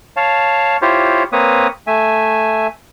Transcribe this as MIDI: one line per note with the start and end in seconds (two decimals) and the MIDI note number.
0.17 0.77 73
0.17 0.77 77
0.17 0.77 81
0.82 1.23 64
0.82 1.23 65
0.82 1.23 67
0.82 1.23 72
0.82 1.23 73
1.33 1.67 58
1.33 1.67 60
1.33 1.67 71
1.33 1.67 73
1.33 1.67 87
1.87 2.67 57
1.87 2.67 76
1.87 2.67 80